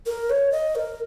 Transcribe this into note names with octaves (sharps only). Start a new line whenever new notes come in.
A#4
C#5
D#5
A#4